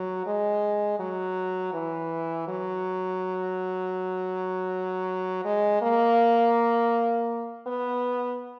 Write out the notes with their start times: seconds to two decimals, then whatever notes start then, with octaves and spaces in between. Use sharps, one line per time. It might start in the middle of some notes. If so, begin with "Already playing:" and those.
Already playing: F#3
0.26 G#3
0.99 F#3
1.73 E3
2.48 F#3
5.45 G#3
5.82 A#3
7.66 B3